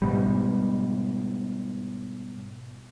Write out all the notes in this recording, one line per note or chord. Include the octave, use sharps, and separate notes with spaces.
G#2 B2 G3